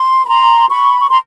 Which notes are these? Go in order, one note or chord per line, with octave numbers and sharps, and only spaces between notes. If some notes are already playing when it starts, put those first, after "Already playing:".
Already playing: C6
B5
A#5 C6
B5 C#6
C#6
A#5 C6